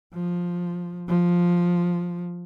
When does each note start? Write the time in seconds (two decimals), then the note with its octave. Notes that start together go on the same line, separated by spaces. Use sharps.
0.14 F3
1.08 F3